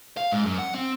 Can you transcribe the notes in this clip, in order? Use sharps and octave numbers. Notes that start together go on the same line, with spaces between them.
F5
G#2
F#2
F#5
C4